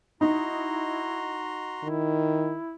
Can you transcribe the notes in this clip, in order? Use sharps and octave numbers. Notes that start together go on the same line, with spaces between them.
D#4 E4 F#4 A#5 C6
D#3 E4